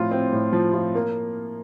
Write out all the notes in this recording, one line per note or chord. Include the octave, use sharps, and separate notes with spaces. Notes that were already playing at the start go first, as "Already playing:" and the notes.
Already playing: A2 F3 C4 F4
C4
A2
F3
F4
A#3